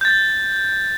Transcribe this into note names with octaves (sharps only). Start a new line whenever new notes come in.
G6 A6